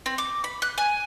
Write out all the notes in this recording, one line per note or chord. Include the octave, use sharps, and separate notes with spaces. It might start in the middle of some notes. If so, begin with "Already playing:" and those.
C4
D6
B5
F#6
G#5